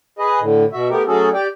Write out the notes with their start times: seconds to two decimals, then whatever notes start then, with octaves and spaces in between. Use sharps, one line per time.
0.19 G#4 B4 D#5
0.41 A2 D3
0.72 B2 F#4 E5
0.90 A3 B3 G4 A#4
1.07 F#3 A3 C#4 F#4 G#4 A4
1.33 G4 D5 G5